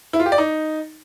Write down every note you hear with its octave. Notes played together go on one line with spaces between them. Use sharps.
E4
F4
G4
D5
D#4